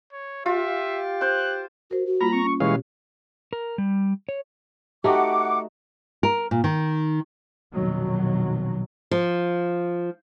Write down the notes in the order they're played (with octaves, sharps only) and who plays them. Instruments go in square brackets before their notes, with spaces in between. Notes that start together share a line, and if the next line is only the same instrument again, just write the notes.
[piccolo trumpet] C#5
[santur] F4 [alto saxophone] G4 [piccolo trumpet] E5
[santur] C5 F5 [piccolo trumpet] F#6
[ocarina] F#4 [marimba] A#4 C5
[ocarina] F#4
[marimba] G3 A#3 F4 [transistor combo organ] A#5 [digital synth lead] B5
[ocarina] C4 [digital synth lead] C#6
[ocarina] C#4
[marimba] B2 G4 [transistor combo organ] E3 G#3 F5 [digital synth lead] C#5
[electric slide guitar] A#4
G3
C#5
[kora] A3 D#4 F#4 [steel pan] G4 [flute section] F#5 D6
[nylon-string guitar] A#4
A#2
D#3
[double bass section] A#1 F2 B2 D#3 F#3
[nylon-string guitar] F3